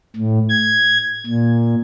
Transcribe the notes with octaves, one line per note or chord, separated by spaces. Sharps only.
A2
G#6
A#2